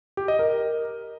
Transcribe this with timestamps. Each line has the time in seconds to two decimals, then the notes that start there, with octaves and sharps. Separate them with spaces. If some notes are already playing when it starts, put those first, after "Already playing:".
0.17 G4
0.28 D#5
0.39 A#4